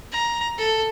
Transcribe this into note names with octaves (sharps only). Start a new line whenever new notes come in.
A#5
A4